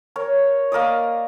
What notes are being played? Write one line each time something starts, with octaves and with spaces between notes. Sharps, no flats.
A#4 C#5
A#3 A#4 D5 D#5